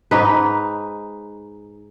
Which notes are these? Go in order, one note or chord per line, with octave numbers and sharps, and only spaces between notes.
G#2 D#4 B4